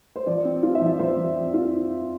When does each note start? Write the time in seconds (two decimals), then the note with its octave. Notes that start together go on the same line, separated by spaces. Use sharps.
0.16 C5
0.26 F3 D5
0.45 C4
0.63 F4
0.75 E5
0.81 F3
0.99 F3 C5
1.17 F3
1.35 C4
1.54 F4